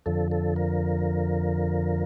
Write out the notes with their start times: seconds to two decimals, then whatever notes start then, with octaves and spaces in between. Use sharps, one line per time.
0.06 F2 D3 F3 A4
0.32 A4
0.56 A#4